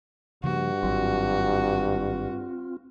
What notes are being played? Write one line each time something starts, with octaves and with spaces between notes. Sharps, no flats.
G2 C#3 F3 A#3 F#4
G#1 F#3 C4 F4